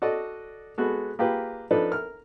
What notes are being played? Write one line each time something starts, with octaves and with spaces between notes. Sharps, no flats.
F#4 A4 D5 D#5
G#3 B3 F#4 A4
A#3 F4 G4 G#4 B4
F3 D4 D#4 A4 B4
A#4 F6